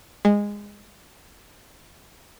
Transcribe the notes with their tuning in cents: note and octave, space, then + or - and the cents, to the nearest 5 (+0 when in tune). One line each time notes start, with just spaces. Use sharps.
G#3 -15